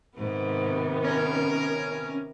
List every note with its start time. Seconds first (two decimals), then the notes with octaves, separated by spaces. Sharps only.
0.17 G#2 C3 D#3 B3
1.04 C#4 A#4